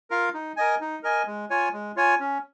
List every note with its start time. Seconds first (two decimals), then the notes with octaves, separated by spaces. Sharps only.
0.10 F4 A#4 F5
0.34 D#4
0.56 A#4 D#5 G#5
0.81 D#4
1.03 A#4 D#5 G#5
1.27 G#3
1.50 F4 C#5 G#5
1.73 G#3
1.96 F4 C#5 G#5
2.20 C#4